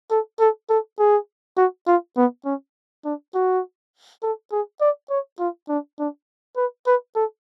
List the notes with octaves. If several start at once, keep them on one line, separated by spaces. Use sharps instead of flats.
A4
A4
A4
G#4
F#4
F4
B3
C#4
D4
F#4
A4
G#4
D5
C#5
F4
D4
D4
B4
B4
A4